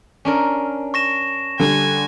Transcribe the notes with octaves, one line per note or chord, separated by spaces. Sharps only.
C#4 D4 A#4
C#6 A#6 E7
D3 G3 G#5